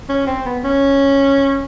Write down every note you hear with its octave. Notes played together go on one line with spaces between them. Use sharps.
C#4
C4
B3
C#4